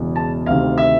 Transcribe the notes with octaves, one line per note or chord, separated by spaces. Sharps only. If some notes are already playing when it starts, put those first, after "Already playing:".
Already playing: E1 E2 C#3 E3
A5
D2 C3 D#3 F5
E5